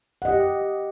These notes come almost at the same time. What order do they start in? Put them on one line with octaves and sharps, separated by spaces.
F#5 D#5 G4